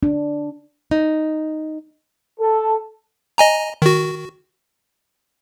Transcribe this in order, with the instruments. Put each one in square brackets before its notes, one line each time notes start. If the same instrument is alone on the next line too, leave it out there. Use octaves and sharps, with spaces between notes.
[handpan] D4
[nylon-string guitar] D#4
[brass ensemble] A4
[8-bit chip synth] D#5 G#5 A#5
D#3 F#4